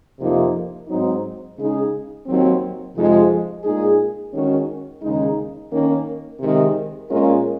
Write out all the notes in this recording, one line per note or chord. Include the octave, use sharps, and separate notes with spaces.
F2 C3 F3 A#3 D#4
G#2 F#3 C4 D#4
C#3 G#3 D#4 G#4
D#2 D#3 F#3 C4
F2 C3 F3 G#3 D#4
A#2 G#3 D#4 G#4
D#3 G#3 C#4 F#4
D#2 C#3 G#3 D#4
D#3 A#3 C#4
C3 D#3 G#3
A#2 G#3 C#4 F4 A#4